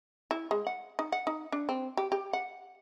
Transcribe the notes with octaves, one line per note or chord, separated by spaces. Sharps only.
E4
G#3
F#5
D#4
F#5
D#4
D4
C4
G4
G4
F#5